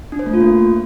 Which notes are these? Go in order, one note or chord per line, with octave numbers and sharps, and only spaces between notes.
D4
C5
A3
F4
A#3